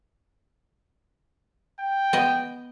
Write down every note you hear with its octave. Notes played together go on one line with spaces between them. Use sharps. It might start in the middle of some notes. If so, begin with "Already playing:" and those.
G5
B3 D#5